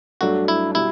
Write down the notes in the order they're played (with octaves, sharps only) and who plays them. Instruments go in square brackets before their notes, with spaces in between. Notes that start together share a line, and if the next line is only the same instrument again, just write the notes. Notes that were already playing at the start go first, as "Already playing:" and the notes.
[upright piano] G2 F#3 A3 D4 [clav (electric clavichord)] F#4
[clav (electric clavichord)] E4
[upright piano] B2 G3 [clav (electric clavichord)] E4